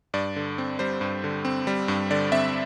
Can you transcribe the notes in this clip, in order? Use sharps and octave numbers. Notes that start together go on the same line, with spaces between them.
G2 D5
D3
C4
G3 C5
G2
D3
C4
G3
G2
D3 D5
C4 E5